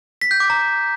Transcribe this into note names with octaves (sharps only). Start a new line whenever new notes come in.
B6
G6
D6
A#5